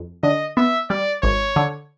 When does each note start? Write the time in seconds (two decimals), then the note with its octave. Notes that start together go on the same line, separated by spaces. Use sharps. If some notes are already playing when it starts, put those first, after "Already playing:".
Already playing: F2
0.23 D3 D#5
0.57 B3 E5
0.90 G3 D5
1.22 G#1 C#5
1.56 D3